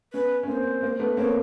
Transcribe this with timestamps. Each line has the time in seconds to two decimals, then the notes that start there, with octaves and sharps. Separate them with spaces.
0.13 B3 C#4 B4
0.43 C#4
0.48 A#3 C4 C5
0.83 A#3
0.99 A3 B3
1.17 A#3 C4 C#5